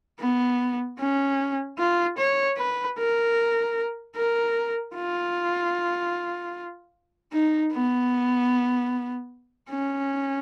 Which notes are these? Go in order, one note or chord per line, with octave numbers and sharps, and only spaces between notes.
B3
C#4
F4
C#5
B4
A#4
A#4
F4
D#4
B3
C#4